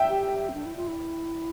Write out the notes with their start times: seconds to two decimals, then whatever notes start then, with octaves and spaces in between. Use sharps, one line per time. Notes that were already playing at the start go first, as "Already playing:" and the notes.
Already playing: E5 G5
0.09 G4
0.49 C4
0.54 D4
0.66 E4
0.76 F4
0.88 E4